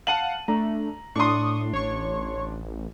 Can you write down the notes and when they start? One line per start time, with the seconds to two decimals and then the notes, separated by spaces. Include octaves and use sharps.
0.07 F5 F#5 A5 D#7 F#7
0.48 A3 D4 A#5
1.15 A2 D4 C6 C#6 D#6
1.73 A1 C#5 C#6